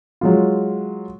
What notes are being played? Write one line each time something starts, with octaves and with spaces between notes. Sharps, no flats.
F#3 G#3 F4